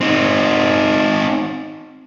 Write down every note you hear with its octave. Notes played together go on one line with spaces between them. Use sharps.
C4 D#4